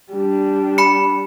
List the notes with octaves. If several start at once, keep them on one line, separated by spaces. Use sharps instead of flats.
G3 D4
B5 C#7